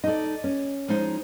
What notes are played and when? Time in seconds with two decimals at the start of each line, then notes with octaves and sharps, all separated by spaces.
0.04 D#4 A4 D5 D#5
0.44 C#4
0.88 F3 G#3 D#4